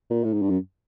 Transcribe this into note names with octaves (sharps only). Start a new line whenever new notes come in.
A#2
A2
G#2
G2
F#2